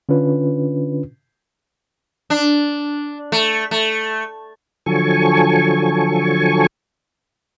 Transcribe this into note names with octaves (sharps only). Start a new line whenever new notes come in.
D3 C#4 D4 F4 B4
D4
A3
A3
D3 F3 F#3 A4 G#5 C#6